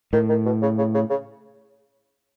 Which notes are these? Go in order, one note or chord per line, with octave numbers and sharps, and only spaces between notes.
A2 D#3
D#3
B2
C#3
C#3
C#3
C#3